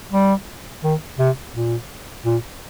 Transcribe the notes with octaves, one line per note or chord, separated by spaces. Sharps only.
G3
D#3
C3
A#2
A#2